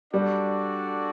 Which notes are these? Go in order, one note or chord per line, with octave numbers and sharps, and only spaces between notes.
G3 D4 F#4 A4 D5